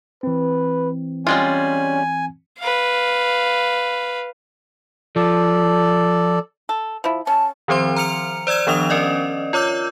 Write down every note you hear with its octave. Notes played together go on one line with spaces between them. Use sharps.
E3 C4 B4
G3 G#3 C#4 F4 G#5
B4 F5
F3 A4 D5
A4
F3 E4
C#4 A5
D#3 F3 C4 C5 C6
A#5 F6 C#7 F7
C5 D5 E6 G#6 E7
D#3 F3 B3 D4 D#6 F7
C#4 A#4 D5 D#5
F4 C#5 D6 E6 G6